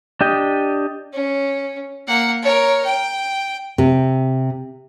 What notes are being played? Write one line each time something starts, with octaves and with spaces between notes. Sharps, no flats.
D4 G4 D#5 G5
C#4
A#3 F#5
A#4 C#5
G5
C3